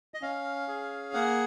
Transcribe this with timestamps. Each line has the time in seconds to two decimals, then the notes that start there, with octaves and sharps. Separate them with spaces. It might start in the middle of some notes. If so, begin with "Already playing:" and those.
0.14 D#5
0.22 C#4 F5
0.68 G#4
1.14 A#3 F#5